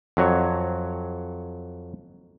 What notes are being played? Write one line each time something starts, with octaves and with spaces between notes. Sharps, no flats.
F2 F#3 C#5